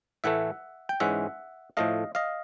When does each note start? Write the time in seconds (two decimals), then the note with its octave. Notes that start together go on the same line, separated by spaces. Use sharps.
0.24 A2 E3 A3 E5 F#5
0.89 G5
1.00 G#2 E3 G#3 C#4 E5 F#5
1.77 A2 F3 A3 D#5 F5
2.15 D#5 F5